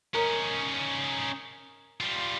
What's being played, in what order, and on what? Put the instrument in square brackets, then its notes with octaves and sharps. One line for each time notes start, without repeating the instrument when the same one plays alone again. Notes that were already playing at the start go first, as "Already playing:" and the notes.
[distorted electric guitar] C#4 D#4 [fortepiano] A#4
[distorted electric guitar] G3 F4